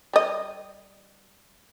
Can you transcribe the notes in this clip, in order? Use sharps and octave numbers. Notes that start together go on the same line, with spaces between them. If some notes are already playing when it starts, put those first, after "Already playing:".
G3 D#5